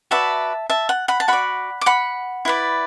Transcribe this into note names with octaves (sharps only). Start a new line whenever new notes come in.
F#4 B4 D5 E5 A5
E5 A5
F#5
F#5 B5
A5
F#4 D5 F#5 B5
D6
F#5 B5
E4 B4 D5